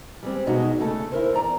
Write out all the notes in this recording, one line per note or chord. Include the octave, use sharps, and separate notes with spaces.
G3 G#3 C4
G2 B2 G#3 D#4 F#4
C#3 A3 A4
E4 A#4 C5
E2 D5 A#5